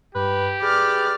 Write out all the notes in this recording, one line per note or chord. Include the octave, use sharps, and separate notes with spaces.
G2 G4 B4
G#4 B4 D5 F6